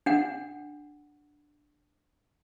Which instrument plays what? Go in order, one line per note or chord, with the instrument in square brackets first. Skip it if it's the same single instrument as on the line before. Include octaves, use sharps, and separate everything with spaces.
[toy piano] D4 F#5